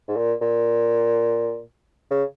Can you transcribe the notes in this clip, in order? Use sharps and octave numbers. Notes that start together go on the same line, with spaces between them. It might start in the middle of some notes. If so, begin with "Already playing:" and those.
G#2
A#2
A#2
C#3